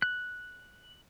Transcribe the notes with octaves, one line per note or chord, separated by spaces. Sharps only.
F#6